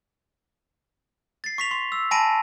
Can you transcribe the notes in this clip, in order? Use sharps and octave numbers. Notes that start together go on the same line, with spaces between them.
A6 C7
C#6 B6 F7
C6
E6
G#5 A5 B5 A#6 D7 D#7